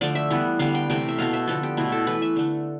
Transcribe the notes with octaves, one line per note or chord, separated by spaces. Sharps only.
D3 F3 A3 D5
E5
E3 G3 B3
D3 G3 B3 F5
G5
C3 E3 A3 G5
E5
B2 A3 F5
E5
D3 F3 B3 A4
G4
B2 A3 E4
A4
E3 A3 B4
E5
D3 A3